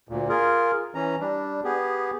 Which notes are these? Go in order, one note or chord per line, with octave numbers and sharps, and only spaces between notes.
D2 A#2
F4 G#4 A#4
E3 C#4 A#5
G3 D4
B3 G4 G#4